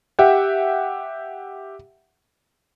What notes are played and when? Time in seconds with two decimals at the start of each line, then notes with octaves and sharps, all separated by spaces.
0.19 G4 E5 F#5 G5